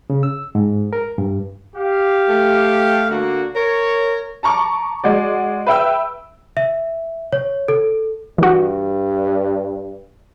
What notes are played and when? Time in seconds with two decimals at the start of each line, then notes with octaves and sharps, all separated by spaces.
0.10 C#3
0.23 E6
0.55 G#2
0.93 A#4
1.18 G2
1.76 G4 F5
2.29 A3
3.10 D3 A#3 F#4
3.56 A#4 C#5
4.43 A5 A#5 C#6 D6
5.04 G#3 F#4 D5
5.67 B4 E5 G5 E6
6.57 E5
7.33 C#5
7.68 A4
8.38 G2 E3 F#4